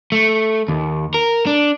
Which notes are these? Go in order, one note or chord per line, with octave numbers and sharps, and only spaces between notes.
A3
D#2
A#4
D4